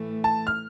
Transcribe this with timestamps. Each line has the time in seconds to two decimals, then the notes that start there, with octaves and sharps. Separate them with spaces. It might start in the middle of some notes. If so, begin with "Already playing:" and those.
Already playing: A2 E3 A3
0.24 A5
0.47 F6